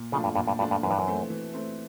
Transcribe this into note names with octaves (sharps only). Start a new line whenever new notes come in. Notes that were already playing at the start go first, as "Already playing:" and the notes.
Already playing: A#2
C#3 F3 A3 D4 F4
G2
G2 A#2
G2
G2 F3 A3 D4 F4
G2
F#2 E3
G2
F#2
A3 C4
E3
A3 C4